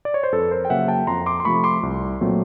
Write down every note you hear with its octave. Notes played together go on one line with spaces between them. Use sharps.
D5
C#5
C5
F2 A4 B4
A#4 C5
G5
C#3 F#3 A#3 E5 F#5
G5 A5
F2 A#5 C6
C6 D6
C6
C3 F3 A3 B5 C#6
C6 D6
C2
A#2 F#3 A3 C4